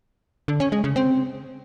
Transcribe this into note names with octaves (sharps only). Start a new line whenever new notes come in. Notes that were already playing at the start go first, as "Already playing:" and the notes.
D3
C#4
G#3
C#3
C4